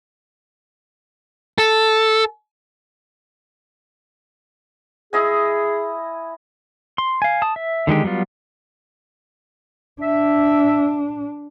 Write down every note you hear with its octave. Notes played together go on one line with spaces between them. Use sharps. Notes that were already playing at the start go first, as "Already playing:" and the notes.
A4
E4 G#4 D#5 G#5
C6
F5 G#5
A5 D#6
E5
D3 D#3 G#3 G4
F#3 G3 B3 F4
D4 E5